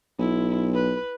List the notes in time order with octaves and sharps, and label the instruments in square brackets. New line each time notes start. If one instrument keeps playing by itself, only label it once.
[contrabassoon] B1 [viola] E4
[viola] B4